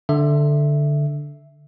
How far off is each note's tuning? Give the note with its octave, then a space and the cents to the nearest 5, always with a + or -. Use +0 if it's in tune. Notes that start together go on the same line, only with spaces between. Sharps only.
D3 +0 E5 +0